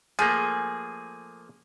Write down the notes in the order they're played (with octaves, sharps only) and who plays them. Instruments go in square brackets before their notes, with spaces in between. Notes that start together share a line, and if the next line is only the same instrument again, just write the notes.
[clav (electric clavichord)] F3 A3 A#3 [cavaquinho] G#4